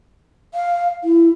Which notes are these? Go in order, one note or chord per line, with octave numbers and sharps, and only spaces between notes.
F5
E4